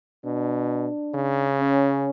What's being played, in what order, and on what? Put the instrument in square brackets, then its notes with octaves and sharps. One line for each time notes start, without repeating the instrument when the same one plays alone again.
[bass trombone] B2 [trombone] D4
[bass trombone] C#3
[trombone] C#4